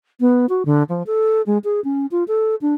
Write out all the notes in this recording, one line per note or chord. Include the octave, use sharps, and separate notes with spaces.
B3
F#4
D3
F3
A4
G#3
G#4
C#4
F4
A4
D4